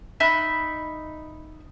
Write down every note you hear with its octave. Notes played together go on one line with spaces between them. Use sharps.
D#4 E5 B5 F#6